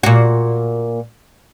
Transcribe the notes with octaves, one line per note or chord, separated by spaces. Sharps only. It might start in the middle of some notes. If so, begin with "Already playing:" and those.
A#2 F#4